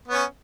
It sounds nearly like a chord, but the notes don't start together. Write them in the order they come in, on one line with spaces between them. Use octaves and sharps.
B3 C#5 C#4